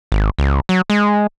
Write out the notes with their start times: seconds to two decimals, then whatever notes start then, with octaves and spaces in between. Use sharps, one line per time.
0.12 G#1
0.39 C#2
0.69 F#3
0.90 G#3